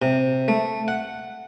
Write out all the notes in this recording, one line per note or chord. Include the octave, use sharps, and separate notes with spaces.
C3
A3
F#5